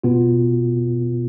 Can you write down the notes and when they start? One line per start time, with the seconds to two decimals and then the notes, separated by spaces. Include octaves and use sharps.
0.04 B2 B3 F4